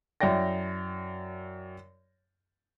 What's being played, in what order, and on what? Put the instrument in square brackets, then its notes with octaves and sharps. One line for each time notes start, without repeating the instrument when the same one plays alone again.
[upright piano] F#2 E4 D5 G5 A#6